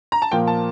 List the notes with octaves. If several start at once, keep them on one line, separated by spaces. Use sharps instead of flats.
A#5
A5
A#2 F3 A#3 F4 G5
A5